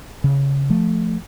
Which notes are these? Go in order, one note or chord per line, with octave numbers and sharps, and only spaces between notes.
C#3
F3 A3